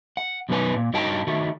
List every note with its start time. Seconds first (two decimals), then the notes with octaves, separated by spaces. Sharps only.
0.17 F#5
0.49 F#2 B2 D#3 C#4 B4 G#5
0.76 A#2
0.94 G2 D#4 F#4 A#4 G5 A5
1.27 D#3 A3 F#4